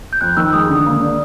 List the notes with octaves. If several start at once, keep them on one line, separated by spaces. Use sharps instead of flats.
G6
F2 F#6
D#3 E6
G#3 D#6
D3
A#3
D4